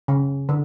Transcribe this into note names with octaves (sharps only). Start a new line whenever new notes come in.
C#3
D3